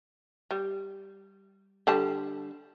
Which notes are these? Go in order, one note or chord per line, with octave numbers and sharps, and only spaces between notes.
G3
D3 G3 A5